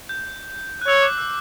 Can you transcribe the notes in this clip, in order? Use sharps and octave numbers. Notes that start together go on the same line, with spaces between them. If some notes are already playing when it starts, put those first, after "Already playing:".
G6
F#6
C#5 E6
D6
E6